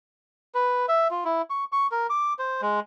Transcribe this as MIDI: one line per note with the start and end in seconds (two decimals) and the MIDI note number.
0.55 0.86 71
0.89 1.08 76
1.11 1.24 65
1.25 1.42 64
1.50 1.64 85
1.72 1.87 85
1.92 2.07 70
2.10 2.33 86
2.39 2.61 72
2.61 2.80 56